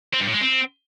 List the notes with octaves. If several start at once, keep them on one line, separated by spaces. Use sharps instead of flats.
C4
G2
A2
G#3
C4